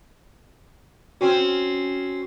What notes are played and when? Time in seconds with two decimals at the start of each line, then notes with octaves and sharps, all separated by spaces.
1.21 C4 C#4 F#4